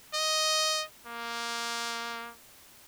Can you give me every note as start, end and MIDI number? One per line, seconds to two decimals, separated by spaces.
0.14 0.83 75
1.06 2.31 58